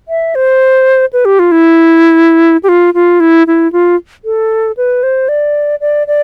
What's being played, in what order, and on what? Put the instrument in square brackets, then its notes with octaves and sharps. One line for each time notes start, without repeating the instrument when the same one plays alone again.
[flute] E5
C5
B4
G4
F4
E4
G4
F4
F4
E4
E4
F4
A4
B4
C5
D5
D5
D5